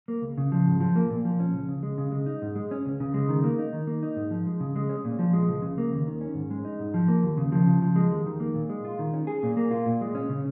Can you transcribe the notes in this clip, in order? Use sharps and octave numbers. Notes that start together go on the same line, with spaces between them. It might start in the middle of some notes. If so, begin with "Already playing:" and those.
A#3
C#2
C#3
F3
G#2
F3
A#3
A#2
F3
C#4
C#2
C#3
G#3
C#3
G#3
D#4
G#2
G#3
C#4
C#2
C#3
G#3
D#3
A#3
D#4
D#3
A#3
D#4
G#2
F3
G#3
C#3
G#3
C#4
A#2
F3
G#3
C#2
C#3
A#3
D#2
D#3
C#4
G#2
G#3
D#4
G#2
F3
A#3
D#2
C#3
F3
C#3
F3
G#3
D#2
D#3
A#3
A#2
G#3
F4
D#3
C#4
G#4
A#2
A#3
F4
A#2
G#3
C#4
C#3